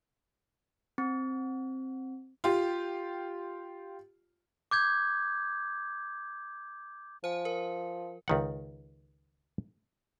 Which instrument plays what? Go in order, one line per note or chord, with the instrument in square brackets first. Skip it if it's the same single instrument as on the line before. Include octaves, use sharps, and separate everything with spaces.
[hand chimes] C4
[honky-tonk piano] F4 G4
[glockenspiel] D6 G6 G#6
[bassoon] F3 [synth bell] C5 G#5
[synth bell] A#4
[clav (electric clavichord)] C#2 D#3 F#5